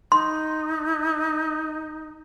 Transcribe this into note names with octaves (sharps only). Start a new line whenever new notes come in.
D#4 C6